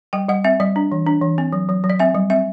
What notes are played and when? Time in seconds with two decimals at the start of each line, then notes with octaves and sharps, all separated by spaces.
0.13 G3 G5
0.29 G3 F#5
0.44 C4 E5
0.60 G3 D5
0.76 D4
0.92 E3
1.07 D4
1.21 E3
1.38 C4
1.53 F#3
1.69 F#3
1.84 F#3
1.90 D5
1.99 C4 E5
2.15 G3
2.30 C4 E5